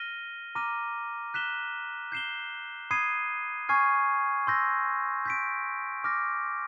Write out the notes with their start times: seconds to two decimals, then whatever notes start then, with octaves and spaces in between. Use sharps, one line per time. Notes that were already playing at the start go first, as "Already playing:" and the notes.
Already playing: F6 A#6 D#7 G7
0.55 A#5 D6 F6 A#6 D#7
1.34 F#6 B6 E7 G7
2.12 G6 C7 E7 G7
2.91 B5 D#6 G#6 C7 D#7
3.69 G#5 C#6 F6 G#6 C7
4.47 C6 E6 G6 A#6
5.25 G6 B6 D7
6.04 D6 F6 A#6